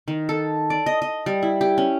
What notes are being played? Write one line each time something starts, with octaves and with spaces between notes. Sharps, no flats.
D#3
A4
D5
D#5
D#5
G3
E4
G4
C#4